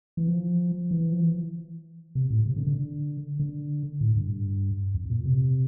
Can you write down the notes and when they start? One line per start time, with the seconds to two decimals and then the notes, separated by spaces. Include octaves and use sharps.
0.17 E3
0.28 F3
0.91 E3
1.12 F3
1.21 E3
2.15 C3
2.30 A2
2.46 C3
2.56 D3
2.66 D3
3.39 D3
4.01 A2
4.16 G2
4.94 F2
5.10 A#2
5.25 C3